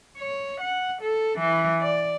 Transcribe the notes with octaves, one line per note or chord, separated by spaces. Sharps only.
C#5
F#5
A4
E3
D5